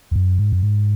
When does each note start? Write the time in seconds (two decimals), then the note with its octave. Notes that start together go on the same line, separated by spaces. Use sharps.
0.11 E2
0.16 F#2
0.39 G#2
0.52 F#2
0.62 G#2